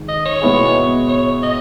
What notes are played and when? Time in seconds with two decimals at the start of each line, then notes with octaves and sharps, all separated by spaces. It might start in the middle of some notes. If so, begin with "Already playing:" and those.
Already playing: G#2 D#3
0.09 D#5
0.25 C#5
0.42 B2 G#3 B3 E4 G#4
1.09 C#5
1.43 D#5